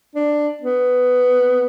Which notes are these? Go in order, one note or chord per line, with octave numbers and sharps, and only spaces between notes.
D4
B3